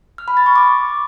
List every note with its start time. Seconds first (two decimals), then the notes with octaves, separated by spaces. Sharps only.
0.18 F6
0.28 B5
0.37 A6
0.46 C#6
0.56 D6